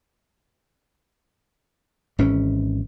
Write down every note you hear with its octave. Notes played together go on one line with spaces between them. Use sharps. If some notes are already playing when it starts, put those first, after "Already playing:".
G#1 E3 C#4